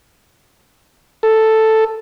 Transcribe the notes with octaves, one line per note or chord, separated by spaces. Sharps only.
A4